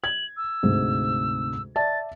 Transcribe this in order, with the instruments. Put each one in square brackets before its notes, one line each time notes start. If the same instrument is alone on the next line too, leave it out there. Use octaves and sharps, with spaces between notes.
[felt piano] G#6 [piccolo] F#7
[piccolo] E6
[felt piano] D2 G#2 C3
[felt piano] D5 E5 A5 [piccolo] A6